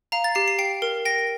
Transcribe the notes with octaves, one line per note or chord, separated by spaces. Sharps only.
F5 A#5
A6
G4 C7
C7
G5 C7
A#4
G5 A#6